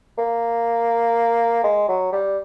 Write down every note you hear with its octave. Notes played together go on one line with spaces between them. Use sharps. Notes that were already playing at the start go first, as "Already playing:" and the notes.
A#3
G#3
F#3
G3